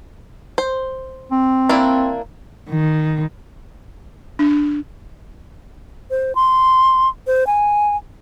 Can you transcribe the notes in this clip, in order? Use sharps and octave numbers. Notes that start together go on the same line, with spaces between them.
C5
C4
A#3 D4 E4
D#3
D4
C5
C6
C5
G#5